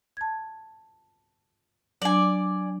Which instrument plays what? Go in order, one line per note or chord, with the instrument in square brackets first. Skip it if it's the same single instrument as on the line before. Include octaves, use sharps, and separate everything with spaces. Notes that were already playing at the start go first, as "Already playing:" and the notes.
[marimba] A5 G#6
[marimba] F#3 D4 [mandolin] D5 G#5